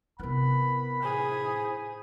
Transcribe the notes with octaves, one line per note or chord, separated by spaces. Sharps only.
C3 B3 E4 A#4 B4 B5
A2 G#4 C5